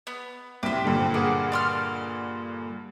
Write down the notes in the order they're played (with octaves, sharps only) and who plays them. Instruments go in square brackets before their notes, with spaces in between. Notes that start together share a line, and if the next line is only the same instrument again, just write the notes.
[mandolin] B3
[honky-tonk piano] C2 B6 [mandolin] G4 C5
[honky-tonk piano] G2 A#2 D3
[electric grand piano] A#3 G#4 F#5 [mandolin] D5
[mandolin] D5 C6 F6